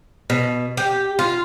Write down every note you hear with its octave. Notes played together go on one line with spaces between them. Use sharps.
B2
G4
F4